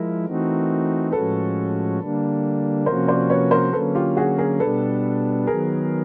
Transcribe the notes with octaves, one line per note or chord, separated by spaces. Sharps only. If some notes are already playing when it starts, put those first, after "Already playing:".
Already playing: F3 G#3 E4 A#4
E3 A3 C4 D#4 F#4
A2 F3 G#3 C#4 F#4 A4 B4
D3 G3 A#3 D4
C3 F3 A#3 C#4 F#4 A#4 C5
C5 D5
B4 C#5
A#4 C5
D3 F#3 A#3 C#4 A4 B4
F4 G4
F#4 G#4
G#4 A#4
B2 G3 B3 D4 A4 B4
D#3 F#3 B3 G#4 A#4